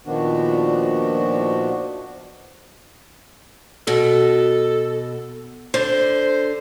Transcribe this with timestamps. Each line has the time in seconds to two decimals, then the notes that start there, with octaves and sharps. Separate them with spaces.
0.06 A#2 D#3 F3 B3 D4 F#4
3.87 B2 A4
5.74 D3 C5